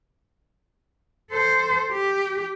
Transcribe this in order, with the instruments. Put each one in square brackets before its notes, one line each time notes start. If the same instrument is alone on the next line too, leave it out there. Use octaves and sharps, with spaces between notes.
[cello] A4 C5
G4